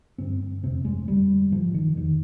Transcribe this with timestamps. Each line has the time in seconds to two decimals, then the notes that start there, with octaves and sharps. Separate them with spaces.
0.18 G2 D3 C4
0.63 F2 C3 C4
0.85 G#3
1.08 F2 D3 G3
1.52 G#2 F3
1.74 D#3
1.96 F2 D3 D#3